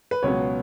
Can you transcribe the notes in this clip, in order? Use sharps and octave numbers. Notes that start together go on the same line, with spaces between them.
B4
C#2 B2 F#3 B3 C#5